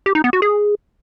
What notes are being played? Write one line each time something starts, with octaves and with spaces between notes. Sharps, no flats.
G4
D#4
B3
F#4
G#4